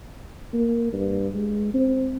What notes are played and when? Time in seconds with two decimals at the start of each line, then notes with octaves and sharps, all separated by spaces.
0.54 A#3
0.93 G2
1.35 G#3
1.74 C4